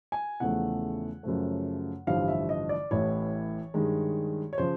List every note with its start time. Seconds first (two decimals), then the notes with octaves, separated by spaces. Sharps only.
0.12 G#5
0.40 E2 C#3 F3 A3 F#5
1.23 F#2 C#3 F3 A3
2.07 A1 G2 D3 F3 F5
2.28 E5
2.49 D#5
2.69 D5
2.91 A1 A2 E3 C#5
3.74 G2 D#3 G#3
4.53 C#5
4.58 C#3 F3 C5